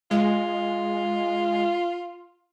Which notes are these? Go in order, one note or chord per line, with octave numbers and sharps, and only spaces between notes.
G#3 F4